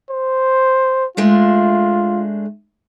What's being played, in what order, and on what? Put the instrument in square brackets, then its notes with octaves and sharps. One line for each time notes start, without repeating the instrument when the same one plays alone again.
[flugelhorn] C5
[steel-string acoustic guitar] G#3 A3 D4 [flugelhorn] F4